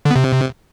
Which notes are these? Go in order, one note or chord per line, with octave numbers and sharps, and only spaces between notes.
D3
B3
C3